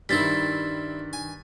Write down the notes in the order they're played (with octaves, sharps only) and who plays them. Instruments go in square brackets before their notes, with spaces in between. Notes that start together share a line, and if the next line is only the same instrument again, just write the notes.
[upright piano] G2 D#3 [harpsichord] G3 C4 E4 [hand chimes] A6 B6
[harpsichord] G#5